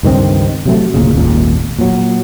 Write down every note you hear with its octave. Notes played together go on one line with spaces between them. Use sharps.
C#2 G2 D#3 C4
C3 F#3 A3
D2 A#2 C#3
D#1 G#1 A#2
A#2 F#3